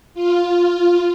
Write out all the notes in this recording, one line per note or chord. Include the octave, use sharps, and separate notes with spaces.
F4